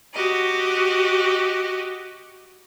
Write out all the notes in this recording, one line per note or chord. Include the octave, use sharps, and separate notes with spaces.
F#4 G4 D#5